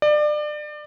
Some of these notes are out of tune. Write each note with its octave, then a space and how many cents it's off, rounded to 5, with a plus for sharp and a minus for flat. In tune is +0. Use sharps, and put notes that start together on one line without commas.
D5 +30